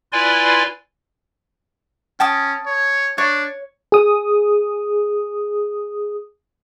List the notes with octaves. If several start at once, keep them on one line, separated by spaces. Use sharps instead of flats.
E4 F4 B4 D5 G#5 C6
C#4 G5 A5 D#6
C#5
D4 C#5
G#4 D#6